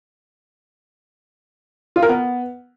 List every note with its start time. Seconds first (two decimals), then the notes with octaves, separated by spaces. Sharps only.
1.96 F4
2.02 A#4
2.09 B3